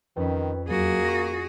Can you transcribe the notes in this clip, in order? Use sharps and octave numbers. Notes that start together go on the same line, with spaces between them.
F2 D#3 C#4 B4 G5 B5
E2 F#3 A#3 F#4 G#4
C#6 A#6